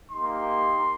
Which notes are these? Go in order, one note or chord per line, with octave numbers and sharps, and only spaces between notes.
A#3 D#4 G4 C6